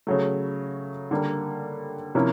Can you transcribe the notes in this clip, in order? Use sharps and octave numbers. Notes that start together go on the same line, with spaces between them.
C#3 F#3 A3
D3 G3 A#3
C3 F3 A#3 C#4 E4